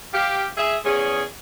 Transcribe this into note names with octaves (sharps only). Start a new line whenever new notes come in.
G4 F5
G#4 E5
E2 C#4 G#4